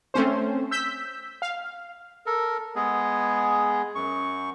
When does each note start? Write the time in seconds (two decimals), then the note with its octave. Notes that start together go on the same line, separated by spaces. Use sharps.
0.14 A3 C4 C#4 C5
0.71 E6 G6 B6
1.42 F5
2.26 A4 A#4
2.76 G#3 B3 G#4
3.95 F#2 C#6